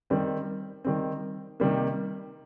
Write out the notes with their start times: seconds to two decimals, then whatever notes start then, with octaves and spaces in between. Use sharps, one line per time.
0.10 D#3 G3 C4
0.84 D#3 G3 C4
1.60 C3 D#3 G3 A#3